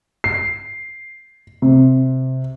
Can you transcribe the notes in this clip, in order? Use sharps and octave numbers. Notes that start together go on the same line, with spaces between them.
C7
C3